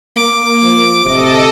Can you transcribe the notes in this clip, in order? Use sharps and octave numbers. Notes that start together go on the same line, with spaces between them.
A#3 D6
F3
D1 C3 A4 D#5